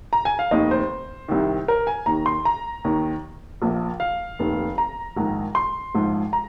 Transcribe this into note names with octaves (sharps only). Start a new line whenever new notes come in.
A#5
G#5
F5
F1 D#2 D#3 D#5
C5
C2 C3 D#3
A#4
G#5
D#2 D#3 A#5
C6
A#5
D#2 D#3
A#1 A#2 F3
F5
F1 D#2 D#3
A#5
A#1 G#2 D#3
C6
A#1 G#2 F3
A#5